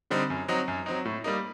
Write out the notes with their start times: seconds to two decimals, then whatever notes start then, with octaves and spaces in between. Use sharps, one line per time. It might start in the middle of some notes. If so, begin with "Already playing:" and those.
0.11 D3 G3 C4 D#4
0.30 F#2
0.48 F#3 C4 D#4
0.68 F#2
0.86 F#3 C4 D#4
1.05 A2
1.24 G3 A#3 D#4